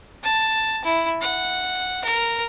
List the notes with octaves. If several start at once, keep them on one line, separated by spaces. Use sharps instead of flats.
A5
E4
F#5
A#4